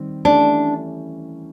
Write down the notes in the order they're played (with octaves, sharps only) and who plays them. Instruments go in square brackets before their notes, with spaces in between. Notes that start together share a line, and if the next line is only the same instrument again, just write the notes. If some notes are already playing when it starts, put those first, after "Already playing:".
Already playing: [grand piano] D#3 G3 C4
[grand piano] E3 A3 C#4 E4 G4 [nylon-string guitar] D4